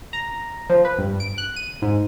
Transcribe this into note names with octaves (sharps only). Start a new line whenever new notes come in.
A#5
F3
B4
G2
D7
F#6
D#7
G#2